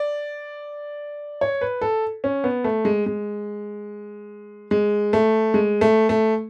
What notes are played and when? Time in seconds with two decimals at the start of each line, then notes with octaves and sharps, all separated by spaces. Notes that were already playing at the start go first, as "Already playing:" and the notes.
Already playing: D5
1.41 C#5
1.61 B4
1.81 A4
2.24 C#4
2.44 B3
2.64 A3
2.85 G#3
3.06 G#3
4.71 G#3
5.13 A3
5.54 G#3
5.81 A3
6.09 A3